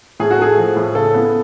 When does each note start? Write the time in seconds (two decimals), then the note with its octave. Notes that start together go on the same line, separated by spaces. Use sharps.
0.20 A2 G#4
0.31 F#4
0.39 A3 G#4
0.57 F3
0.76 A2
0.95 C#3 A4
1.14 B3